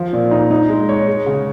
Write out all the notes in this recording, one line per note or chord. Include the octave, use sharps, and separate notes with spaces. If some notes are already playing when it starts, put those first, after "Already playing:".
Already playing: F3
A#2
D#4
D#4
G#3
C#5
G#3
C#3